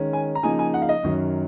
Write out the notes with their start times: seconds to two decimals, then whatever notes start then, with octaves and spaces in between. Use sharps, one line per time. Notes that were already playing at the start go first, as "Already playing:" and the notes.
Already playing: D#3 G#3 C#4
0.13 G#5
0.35 A#5
0.43 C#3 F3 A#3 D#4 G#5
0.59 G#5
0.74 F#5
0.82 F5
0.89 D#5
1.03 F#2 D#3 F#3